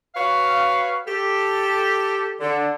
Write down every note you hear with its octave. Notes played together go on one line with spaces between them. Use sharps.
F#4 B4 C#5 F5
G4 A4
D3